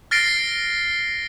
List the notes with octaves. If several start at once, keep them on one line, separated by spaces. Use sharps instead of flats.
F6 A6 A#6 C7 D7 G7